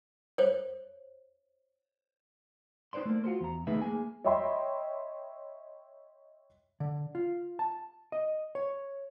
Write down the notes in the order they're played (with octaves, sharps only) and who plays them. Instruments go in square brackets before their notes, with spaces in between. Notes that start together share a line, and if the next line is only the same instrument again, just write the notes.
[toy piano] C5 C#5
[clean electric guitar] D#4 B4 C5 D5 C6
A3 A#3
F4 F#4 A4 C5
E2 A#5
D#2 A3 D#4 G#4 B4 E5
A#3 G#4 G#5
[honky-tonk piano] C#5 D#5 E5 G5 B5 C6
[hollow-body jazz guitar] D3
F4
A5
D#5
C#5